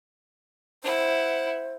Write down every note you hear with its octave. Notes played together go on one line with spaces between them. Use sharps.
E4 C5 F#5